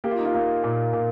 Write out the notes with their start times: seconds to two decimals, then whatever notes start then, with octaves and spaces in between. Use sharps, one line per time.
0.04 A#3 G4
0.11 F4
0.18 D#4
0.25 F4
0.34 A#3
0.64 A#2
0.93 A#2